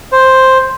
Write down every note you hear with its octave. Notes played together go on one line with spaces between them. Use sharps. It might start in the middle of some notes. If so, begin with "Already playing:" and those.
C5